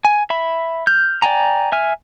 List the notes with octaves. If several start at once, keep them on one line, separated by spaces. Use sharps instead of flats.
G#5
E5 B5
F6 G6
D5 G5 G#5 A#5
E5 G#5 F6